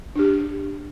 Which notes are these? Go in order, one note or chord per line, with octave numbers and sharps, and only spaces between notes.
D4 G4